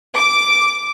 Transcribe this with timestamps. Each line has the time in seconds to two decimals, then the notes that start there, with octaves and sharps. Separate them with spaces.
0.15 D6